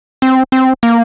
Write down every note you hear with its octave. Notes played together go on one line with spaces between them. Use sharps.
C4
C4
A#3